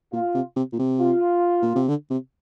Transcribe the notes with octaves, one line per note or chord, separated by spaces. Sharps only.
A#2 F4
C3
C3
A#2
C3
F4
A#2
C3
D3
C3